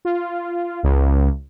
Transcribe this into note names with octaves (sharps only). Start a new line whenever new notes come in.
F4
C#2